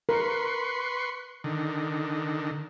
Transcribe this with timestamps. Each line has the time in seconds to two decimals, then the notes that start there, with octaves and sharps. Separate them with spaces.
0.09 A#4 B4 C6 C#6
1.44 D3 D#3